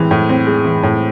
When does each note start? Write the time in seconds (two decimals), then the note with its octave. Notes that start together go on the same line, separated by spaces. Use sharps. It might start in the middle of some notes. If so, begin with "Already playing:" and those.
Already playing: A2 E3 G#3 C4
0.11 A2
0.29 C4
0.46 G#3
0.65 E3
0.83 A2